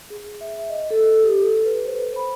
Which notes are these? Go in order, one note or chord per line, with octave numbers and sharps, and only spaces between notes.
G#4
E5
D#5
A4
G4
A4
B4
C5
B5